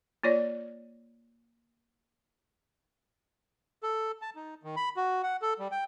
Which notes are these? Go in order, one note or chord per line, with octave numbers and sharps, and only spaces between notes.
A#3 F4 C#5 D5
A4
A5
D#4
D#3
B5
F#4
F#5
A4
G3
G5